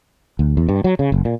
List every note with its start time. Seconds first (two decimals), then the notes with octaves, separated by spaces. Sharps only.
0.39 D2
0.57 E2
0.69 G2
0.84 F#3
0.99 C#3
1.12 F#1
1.25 A#2